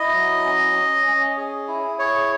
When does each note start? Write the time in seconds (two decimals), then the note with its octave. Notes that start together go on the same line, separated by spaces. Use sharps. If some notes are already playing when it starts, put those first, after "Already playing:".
Already playing: E4 D#5
0.13 F#3
0.44 C#4
0.75 C#4
1.06 C#4
1.37 G#4
1.68 E4
1.99 G#4 C#5